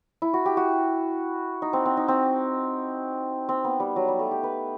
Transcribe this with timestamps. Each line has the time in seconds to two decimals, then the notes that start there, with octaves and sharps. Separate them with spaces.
0.22 E4
0.34 F#4
0.45 G4
0.57 F#4
1.62 D#4
1.73 C4
1.85 C4
1.97 D#4
2.08 C4
3.49 C4
3.64 B3
3.80 G3
3.96 F#3
4.08 G3
4.19 A3
4.31 G4
4.43 B4